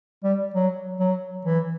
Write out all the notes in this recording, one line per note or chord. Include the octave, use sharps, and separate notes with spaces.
G3
F#3
F#3
E3